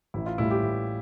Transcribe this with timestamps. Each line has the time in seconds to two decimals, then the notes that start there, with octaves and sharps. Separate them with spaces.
0.14 A1 E4
0.26 F4
0.38 A2 E3 G3 E4
0.51 G4
0.62 A1